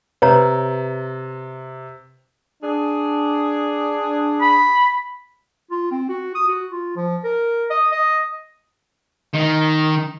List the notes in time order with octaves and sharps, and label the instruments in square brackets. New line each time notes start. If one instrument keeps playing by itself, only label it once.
[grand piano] C3 [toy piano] B4 C#5 A#5
[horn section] D4 G#4
[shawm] B5
[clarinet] F4
C4
F#4
D#6
F#4
F4
F3
A#4
D#5
D#5
[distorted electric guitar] D#3